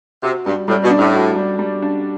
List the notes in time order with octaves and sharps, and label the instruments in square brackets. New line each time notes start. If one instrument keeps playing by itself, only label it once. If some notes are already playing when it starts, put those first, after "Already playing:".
[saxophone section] C3 [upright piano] F#4
[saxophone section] G2 [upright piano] G3
[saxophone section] A2 [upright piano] G3
[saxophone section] B2
[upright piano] D4
[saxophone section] A2
[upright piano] F#4
G3
G3
D4